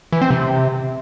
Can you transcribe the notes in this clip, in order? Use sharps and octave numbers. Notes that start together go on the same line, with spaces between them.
E3
C4
C3